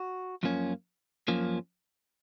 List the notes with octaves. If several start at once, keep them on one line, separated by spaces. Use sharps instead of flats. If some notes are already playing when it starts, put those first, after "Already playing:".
Already playing: F#4
F#2 F3 A#3 C#4
F#2 F3 A#3 C#4